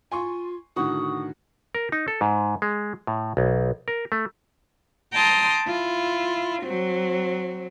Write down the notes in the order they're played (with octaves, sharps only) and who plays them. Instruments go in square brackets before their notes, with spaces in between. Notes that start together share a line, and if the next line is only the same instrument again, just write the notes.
[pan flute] F4 [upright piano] G#5 C6 C#6
[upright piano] A2 D3 D#3 [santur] F#4 F#5 [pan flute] D#6
[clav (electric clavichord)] A#4
D#4
A4
G#2
G#3
A2
B1
A#4
A3
[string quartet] G5 A5 A#5 C6 D#6
E4 F4
F#3 C4